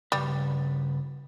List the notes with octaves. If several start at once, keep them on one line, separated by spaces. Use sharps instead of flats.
G2 C#3 G3 B4